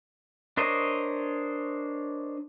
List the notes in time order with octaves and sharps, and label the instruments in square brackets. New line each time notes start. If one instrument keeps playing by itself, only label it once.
[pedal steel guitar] D4 A#4 C5 C#5 D#5